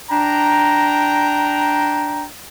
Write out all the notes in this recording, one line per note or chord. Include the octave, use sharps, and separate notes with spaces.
D4 G5 A#5